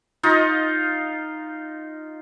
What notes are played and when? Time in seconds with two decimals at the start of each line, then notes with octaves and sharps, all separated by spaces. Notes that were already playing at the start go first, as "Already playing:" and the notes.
0.23 D#4 F4 D#5